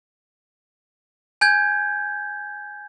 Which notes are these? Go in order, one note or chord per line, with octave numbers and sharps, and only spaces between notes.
G#5 G6 G#6